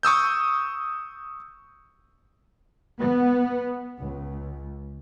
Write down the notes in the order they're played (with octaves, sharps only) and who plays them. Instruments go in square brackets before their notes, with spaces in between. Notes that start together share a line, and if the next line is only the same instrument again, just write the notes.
[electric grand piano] C#6 D#6 E6 G6
[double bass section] B3
C#2